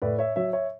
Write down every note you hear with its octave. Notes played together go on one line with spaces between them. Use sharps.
A2 B4 D5
C#5 E5
F#3 C#5 E5
C#5 E5